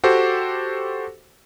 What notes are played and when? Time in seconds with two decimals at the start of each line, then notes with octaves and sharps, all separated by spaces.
0.04 F#4 G4 A4 C5